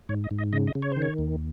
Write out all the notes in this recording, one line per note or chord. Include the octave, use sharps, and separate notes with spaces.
G#2 C#5
D#5
G#2
D#5
C#3 D#5
D#5
C#3
C#5
D#3 C5
C#5
D#2